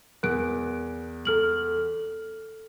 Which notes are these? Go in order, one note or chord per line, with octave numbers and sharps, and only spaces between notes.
E2 A#4 F#6 D7
A4 F6 F#7